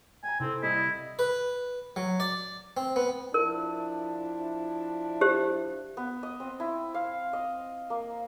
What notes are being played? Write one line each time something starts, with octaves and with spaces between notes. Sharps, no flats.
G5 G#5 A#5
C3 C4 E4 A4 C5
C2 E4 D#5
B4
F#3
D5
C4
B3
F3 D4 E4 A#4
G4 C5
B3
D#5
C4
E4
F5
D#5
A#3